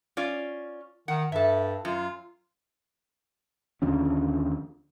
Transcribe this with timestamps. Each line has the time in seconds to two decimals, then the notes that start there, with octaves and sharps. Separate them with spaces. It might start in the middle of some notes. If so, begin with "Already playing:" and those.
0.17 C#4 F4 D5
1.08 D#3 F#5
1.32 G2 A4 E5
1.85 F#2 F4
3.82 D#2 D3 F3 C#4